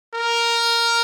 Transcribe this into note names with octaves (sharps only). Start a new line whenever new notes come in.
A#4